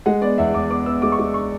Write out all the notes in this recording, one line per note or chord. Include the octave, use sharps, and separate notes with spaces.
G#3 F#5
B3 D5
E2 E5
E2 D6
B3 D6
B3 E6
G#3 D6
C#6
G#3 D6
C#6